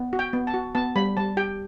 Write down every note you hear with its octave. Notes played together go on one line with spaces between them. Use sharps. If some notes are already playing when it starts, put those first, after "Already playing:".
Already playing: B3
F#4
G5
B3
A5
F#4
B3 A5
G3 B5
G3 A5
G4 G5